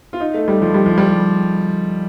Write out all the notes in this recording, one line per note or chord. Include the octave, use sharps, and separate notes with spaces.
F4
D#4
A3
G3
F3
G3
F3
G3